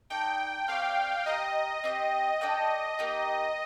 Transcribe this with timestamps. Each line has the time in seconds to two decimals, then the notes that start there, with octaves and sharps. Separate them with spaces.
0.10 D#4 A4 D5 G5
0.68 A3 C4 G4 D5 F5
1.26 G4 A#4 D#5 F5
1.84 C4 G4 C5
2.41 D4 A4 D5 G5
2.99 A#3 D#4 G4